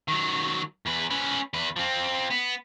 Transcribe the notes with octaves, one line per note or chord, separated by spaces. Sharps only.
D#3 F#3
E2 B4
C#4 B4
E2 B4
F3 C4
B3